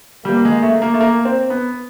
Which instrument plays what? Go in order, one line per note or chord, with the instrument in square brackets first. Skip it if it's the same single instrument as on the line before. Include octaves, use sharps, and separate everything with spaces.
[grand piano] G3 [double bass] A#3
[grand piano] G#3
A3
A#3
A3
A#3
C4
B3